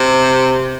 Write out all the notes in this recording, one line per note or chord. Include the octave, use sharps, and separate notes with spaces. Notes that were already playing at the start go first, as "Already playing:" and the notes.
Already playing: C3